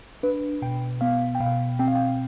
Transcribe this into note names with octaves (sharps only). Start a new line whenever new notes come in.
D4 B4
B2 G5
B3 F5
G5
B2 F5
C4 G5
F5
G5